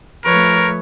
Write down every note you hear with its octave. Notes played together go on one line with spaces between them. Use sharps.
F3 A3 A#4 B4 C#5